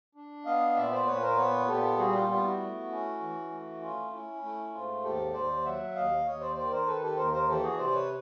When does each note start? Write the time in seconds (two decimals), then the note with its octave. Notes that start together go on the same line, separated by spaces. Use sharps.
0.15 D4
0.45 B3 D#5 F5
0.76 A#2 D5 E5
0.91 C5 D5
1.06 A#2 B4 C#5
1.22 A#4 C5
1.37 B3 B4 C#5
1.67 A#2 G4 A4
1.98 G3 F#4 G#4
2.13 F4 G4
2.28 B3 F4 G4
2.44 E4 F#4
2.60 A3
2.90 C#4
3.20 E3
3.51 A3
3.81 C#4 F4
4.12 C#4 E4
4.42 A3 E4
4.72 G#2 F4
5.03 D#2 G4 A4
5.33 D#2 C5 D5
5.65 F#3 E5 F#5
5.95 D#2 D#5 F5
6.25 D#2 C#5 D#5
6.41 C5 D5
6.56 D#3 C5 D5
6.71 A#4 C5
6.86 D#3 A4 B4
7.02 G4 A4
7.17 D#2 A#4 C5
7.33 A#4 C5
7.48 E3 G4 A4
7.63 F#4 G#4
7.78 C3 C5 D5
7.94 B4 C#5